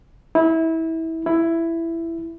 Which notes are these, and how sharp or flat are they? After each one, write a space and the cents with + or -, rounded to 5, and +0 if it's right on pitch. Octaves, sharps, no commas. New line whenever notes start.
E4 -25
E4 +10